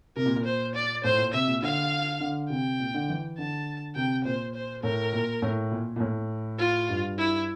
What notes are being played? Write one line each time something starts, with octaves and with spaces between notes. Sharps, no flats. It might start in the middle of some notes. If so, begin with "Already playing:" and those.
C3 A#4
A#2
A#2
C5
D5
A2 C5
A#2
C3 E5
A#2
D3 F5
D3
C3 G5
A#2
D3
E3
D3 A5
C3 G5
A#2 C5
C5
A2 A#4
A#2
A2
A#2
A#2
A2
F4
G2
E4